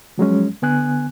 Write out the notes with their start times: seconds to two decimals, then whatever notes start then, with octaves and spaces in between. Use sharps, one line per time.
0.18 F3 F#3 G#3 C#4
0.62 D3 B3 G#5 F#6